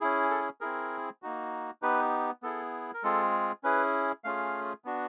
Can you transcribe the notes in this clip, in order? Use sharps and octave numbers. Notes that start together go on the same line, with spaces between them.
C#4 E4 G#4
A4
C4 E4 G#4 A#4
A#3 D#4 F#4
B3 D#4 G4 B4
B3 E4 G#4 A4
A#4
G#3 C4 F4 G#4 A4
C#4 E4 G#4 B4
A3 C#4 F4 G#4 F5
B3 D4 F#4